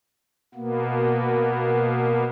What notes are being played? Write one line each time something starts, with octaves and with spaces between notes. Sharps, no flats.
B2 A#3 B3